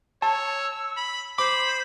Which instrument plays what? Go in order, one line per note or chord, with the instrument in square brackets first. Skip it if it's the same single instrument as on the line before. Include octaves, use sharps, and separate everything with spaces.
[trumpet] C#5 [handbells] A5 [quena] E6
[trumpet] B5
[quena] C5 [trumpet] B5 [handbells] D6